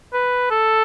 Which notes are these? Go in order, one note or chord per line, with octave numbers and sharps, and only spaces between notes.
B4
A4